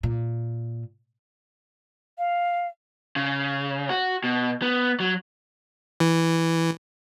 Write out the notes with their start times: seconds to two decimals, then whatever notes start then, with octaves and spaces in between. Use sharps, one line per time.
0.03 A#2
2.18 F5
3.16 C#3
3.89 F#4
4.24 B2
4.62 B3
5.00 F#3
6.00 E3